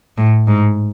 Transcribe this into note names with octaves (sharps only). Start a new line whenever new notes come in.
A2
G#2